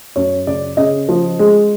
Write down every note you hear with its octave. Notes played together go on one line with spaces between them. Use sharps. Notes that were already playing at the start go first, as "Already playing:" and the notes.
F#2 C#5
C#3 D5
C#3 D#5
F3
G#3